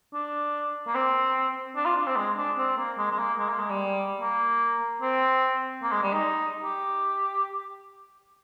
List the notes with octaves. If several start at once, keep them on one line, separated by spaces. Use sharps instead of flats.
D4
A#3
C4
D4
F4
D4
C4
G#3
D4
C4
A#3
G#3
G#3
A#3
G#3
A#3
G#3
G3
A#3
C4
A#3
G#3
G3
D#4
G4